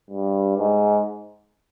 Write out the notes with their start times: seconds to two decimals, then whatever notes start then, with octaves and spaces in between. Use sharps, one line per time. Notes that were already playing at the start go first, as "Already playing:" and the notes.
0.10 G2
0.58 G#2